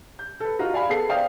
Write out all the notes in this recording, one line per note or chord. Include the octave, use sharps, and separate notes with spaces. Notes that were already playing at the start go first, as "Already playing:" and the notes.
G6
A4 B4
D#4 F4 F#4 A#5
D5 F5 G#5 B5
B3 G#4 A4 A5 C7
C5 D5 F5 G5 D#6 F6